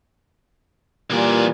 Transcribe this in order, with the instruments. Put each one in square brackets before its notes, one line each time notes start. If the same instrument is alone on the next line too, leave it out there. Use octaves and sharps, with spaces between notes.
[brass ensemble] A#2 G3 [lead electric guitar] E3 D5